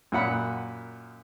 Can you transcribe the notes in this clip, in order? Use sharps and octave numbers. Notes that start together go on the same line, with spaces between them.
F#2 A#2 F#5 B5